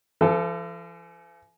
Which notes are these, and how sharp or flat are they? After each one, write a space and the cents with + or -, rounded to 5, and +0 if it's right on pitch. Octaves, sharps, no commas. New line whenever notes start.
F3 -45 A4 +0